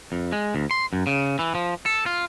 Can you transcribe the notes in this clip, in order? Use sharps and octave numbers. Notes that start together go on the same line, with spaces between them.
F2
G#3
D2
C6
F#2
C#3
E3
F3
A4
F4